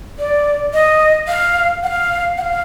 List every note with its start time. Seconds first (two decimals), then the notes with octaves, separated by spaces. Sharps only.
0.19 D5
0.73 D#5
1.28 F5
1.83 F#5
1.87 F5
2.37 F#5
2.41 F5